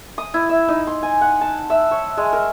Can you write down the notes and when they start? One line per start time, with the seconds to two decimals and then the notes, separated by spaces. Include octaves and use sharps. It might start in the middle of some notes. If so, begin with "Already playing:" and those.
0.18 D#6
0.34 E4
0.49 E5
0.68 D#4
0.87 C6
1.03 G#5
1.21 F#5
1.41 A5
1.70 E5
1.91 C#5
2.17 G#3
2.33 A#4